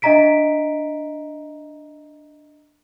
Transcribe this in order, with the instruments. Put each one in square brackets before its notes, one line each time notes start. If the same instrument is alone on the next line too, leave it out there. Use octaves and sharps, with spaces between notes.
[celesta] D4 D#5 E5 A#5 B6 D7